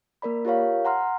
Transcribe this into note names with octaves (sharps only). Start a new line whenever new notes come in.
A#3 A#4 D5 B5
F4 G4 A#4 C#5 F5
F#5 A#5 C6 F6